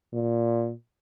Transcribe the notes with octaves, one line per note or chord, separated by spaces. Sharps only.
A#2